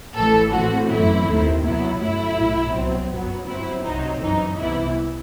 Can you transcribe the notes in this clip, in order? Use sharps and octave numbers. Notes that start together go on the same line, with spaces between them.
A1 A2 E3 A3 A4
A2 E3 A3 C4 F#4
G1 F#2 E3 A3 C4 E4
D#2 D#3 A3 C4
C2 B2 F#3 B3 E4
G1 F#2 F#3 A3 E4
B1 A2 F#3
C2 B2 F#3 C4
G1 F#2 F#3 B3
G1 G2 F#3 C4 E4
C2 C3 F#3 C4 D#4
G1 F#2 E3 D#4
C2 C3 E3 G3 B3 E4